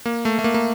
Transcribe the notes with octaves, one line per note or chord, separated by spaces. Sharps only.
A#3
A3
A3
A#3
A#3